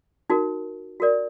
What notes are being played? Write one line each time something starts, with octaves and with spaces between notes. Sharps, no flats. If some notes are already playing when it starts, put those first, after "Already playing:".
D#4 F#4 A#4
F#4 A#4 D5